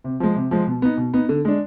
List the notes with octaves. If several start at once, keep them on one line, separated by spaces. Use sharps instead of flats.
C3
F3 G#3
C3
F3 G#3
B2
B3 D#4
B2
B3 D#4
D3
G#3 D4